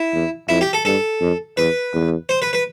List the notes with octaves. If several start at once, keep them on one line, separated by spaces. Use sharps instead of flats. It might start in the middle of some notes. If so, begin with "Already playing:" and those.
Already playing: E4
E2
F2 E4
G4
A4
G2 A4
F2
E2 B4
E2
C5
B4
B4